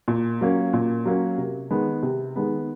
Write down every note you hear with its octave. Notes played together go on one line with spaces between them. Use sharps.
A#2
F#3 A#3 C#4
A#2
F#3 A#3 C#4
C3
D#3 G#3 B3
C3
D#3 G#3 B3